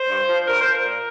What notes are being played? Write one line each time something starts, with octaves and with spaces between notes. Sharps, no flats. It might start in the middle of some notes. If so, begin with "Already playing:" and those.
Already playing: C5
G2
F3
G2 A#4
F3 C5
A#4
A#2